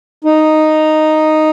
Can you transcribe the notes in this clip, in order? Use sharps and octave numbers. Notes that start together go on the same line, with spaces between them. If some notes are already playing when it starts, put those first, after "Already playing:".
D#4